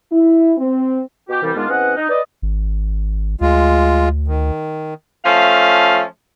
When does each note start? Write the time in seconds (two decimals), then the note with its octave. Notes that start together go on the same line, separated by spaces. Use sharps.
0.12 E4
0.58 C4
1.29 B2 F#4 G4
1.42 C2 E3 G3
1.55 G#2 D#3 G#3 B3 D4 F4
1.69 E2 C4 C#4 B4 D#5 F#5
1.96 D#4
2.09 B4 D5 D#5
2.42 G#1
3.41 D2 G#3 F4
4.28 D#3
5.25 F3 A3 C#4 F5